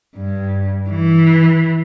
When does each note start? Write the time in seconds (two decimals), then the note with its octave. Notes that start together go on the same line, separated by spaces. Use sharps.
0.17 G2
0.89 E3